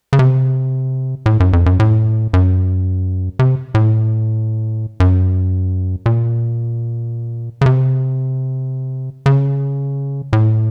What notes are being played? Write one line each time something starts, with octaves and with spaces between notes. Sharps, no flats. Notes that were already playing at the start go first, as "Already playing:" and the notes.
C#3
C3
A2
F#2
F2
F#2
A2
F#2
C3
A2
F#2
A#2
C#3
C3
C#3
A2